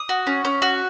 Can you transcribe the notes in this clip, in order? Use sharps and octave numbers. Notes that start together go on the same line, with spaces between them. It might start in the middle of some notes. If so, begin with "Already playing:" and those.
Already playing: D#6
F#4
C#4
C#4
F#4